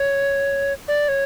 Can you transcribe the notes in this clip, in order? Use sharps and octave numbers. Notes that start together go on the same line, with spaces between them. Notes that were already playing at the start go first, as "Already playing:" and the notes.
Already playing: C#5
D5
C#5